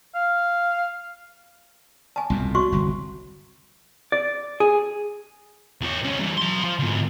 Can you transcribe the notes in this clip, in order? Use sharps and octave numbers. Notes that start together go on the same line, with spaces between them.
F5
G#5 A5
C2 F2 B2
F#4 C6 C#6
G1 C2
D5
G#4
E2 C#5
C2 C#4
E3 G3
F#3 C6
F3
G#2 D3